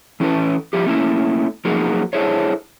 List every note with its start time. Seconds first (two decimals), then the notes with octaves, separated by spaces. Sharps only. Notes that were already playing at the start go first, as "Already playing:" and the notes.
0.20 E3 C#4 E4 A4 B4
0.73 F3 G3 E4 G4
0.85 A3 A#3 C#4 E4
1.65 F3 F#3 A#3 D#4 F#4 G#4
2.13 D4 E4 G#4 A4 C5 C#5